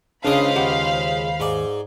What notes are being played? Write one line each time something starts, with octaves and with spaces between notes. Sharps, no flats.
C#2 C#3 D4 C5 D#5 F5 B5
D#2 G4 F#5
G#2 D5